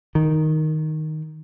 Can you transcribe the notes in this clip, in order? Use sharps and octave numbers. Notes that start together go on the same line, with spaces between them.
D#3